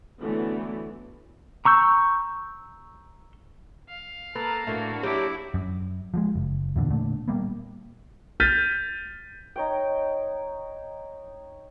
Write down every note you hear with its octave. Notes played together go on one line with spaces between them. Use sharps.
D3 E3 F#3 A3 B3
A#5 C#6 E6 G6
F5
A#3 A4 B4 A5 A#5
A2 A3 A#3 D4 E4 F#4
F#3 A#3 E4 G4 C#5 D5 D6
F#2
F3 G3 G#3
F#1
E2 A#2 D3
A#2 D3 A3
A#2 G3 A#3 B3
F6 G6 A6 B6 D#7
D#4 C#5 G5